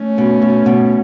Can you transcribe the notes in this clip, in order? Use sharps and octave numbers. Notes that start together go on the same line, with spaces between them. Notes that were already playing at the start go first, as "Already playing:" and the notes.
Already playing: A3 C#4
B2
B2
B2